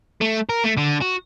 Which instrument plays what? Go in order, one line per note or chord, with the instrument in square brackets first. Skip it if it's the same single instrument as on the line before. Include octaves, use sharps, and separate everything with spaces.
[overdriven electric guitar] A3
A#4
A3
D3
F#4